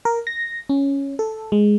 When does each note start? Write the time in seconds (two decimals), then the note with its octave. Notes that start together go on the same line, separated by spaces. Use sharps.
0.05 A#4
0.27 A#6
0.69 C#4
1.19 A4
1.52 G#3